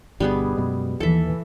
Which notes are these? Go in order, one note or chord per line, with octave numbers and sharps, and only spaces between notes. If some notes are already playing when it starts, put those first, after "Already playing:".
G1 B2 G3 B3 D4 G#4
F#2 B2 G#3
D#2 E3 A4 E5